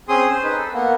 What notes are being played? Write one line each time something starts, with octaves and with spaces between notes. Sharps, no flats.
C4 C#4 G#4 C6 D#6
C5
D#4 B4
A4
A#3 B3